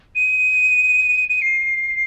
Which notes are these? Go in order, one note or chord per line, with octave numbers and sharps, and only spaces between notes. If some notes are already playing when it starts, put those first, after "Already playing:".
D#7
D#7
C7